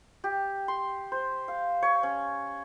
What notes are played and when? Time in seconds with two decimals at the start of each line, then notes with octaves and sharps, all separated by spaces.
0.24 G4
0.68 C6
1.12 C5
1.48 F5
1.82 C#5
2.03 C#4